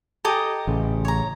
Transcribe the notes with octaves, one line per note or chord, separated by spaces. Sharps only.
G4 A4 D#5 G5 G#5 A#5
A1 C#3
C#5 A#5